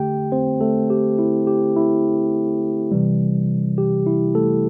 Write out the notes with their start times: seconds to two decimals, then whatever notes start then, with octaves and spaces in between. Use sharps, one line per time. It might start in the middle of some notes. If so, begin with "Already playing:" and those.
Already playing: D3 A3 G4 G5
0.32 C4 C5
0.61 A3 A4
0.90 G4
1.19 E4
1.47 G4
1.76 E4
2.92 C3 E3 G3
3.78 G4
4.07 E4
4.35 A3 A4